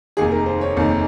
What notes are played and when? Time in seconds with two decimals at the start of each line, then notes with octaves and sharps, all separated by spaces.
0.17 F1 D#2 D#3 G#4
0.31 A#4
0.46 C5
0.61 C#5
0.76 F1 D#2 D#3